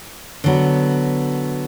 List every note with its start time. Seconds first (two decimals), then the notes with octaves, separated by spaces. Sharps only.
0.44 D3 F#3 B3